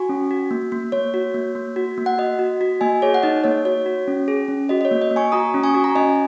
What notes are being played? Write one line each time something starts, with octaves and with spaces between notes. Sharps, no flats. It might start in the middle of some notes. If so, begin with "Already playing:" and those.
Already playing: F#4 G#5 C#6
C#4
F#4
A#3
A#3
A#3 C#5
F#4
A#3
A#3
F#4
A#3
F#5
F#4 D#5
F#4
F#4
A#3 D#5 G#5
G#4 C#5
F#5
D#4 D#5
A#3 C#5
F#4 C#5
F#4
C#4
G#4
C#4
F#4 D#5
D#5
C#5
A#3
D#5
A#3
G#5 C#6
F#4 A#5 D#6
C#4
G#5 C#6
F#4
A#5
C#4 D#5 G#5